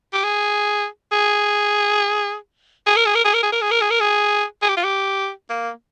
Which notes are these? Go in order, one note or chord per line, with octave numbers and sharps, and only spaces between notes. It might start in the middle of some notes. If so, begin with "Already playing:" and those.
G4
G#4
G#4
G#4
A#4
G#4
A#4
G#4
A#4
G#4
A#4
G#4
A#4
G#4
A#4
G#4
G#4
G4
F4
G4
A#3